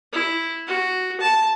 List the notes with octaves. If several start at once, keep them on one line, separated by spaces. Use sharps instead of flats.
E4
F#4
A5